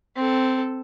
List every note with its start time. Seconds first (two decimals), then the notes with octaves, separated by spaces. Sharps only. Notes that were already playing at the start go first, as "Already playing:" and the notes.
0.16 C4 A4